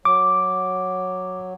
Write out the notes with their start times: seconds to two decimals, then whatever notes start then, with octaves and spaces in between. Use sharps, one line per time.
0.05 F#3 D6